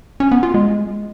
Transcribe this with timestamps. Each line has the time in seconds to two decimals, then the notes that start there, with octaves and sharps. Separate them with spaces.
0.20 C#4
0.32 B3
0.43 F4
0.54 G#3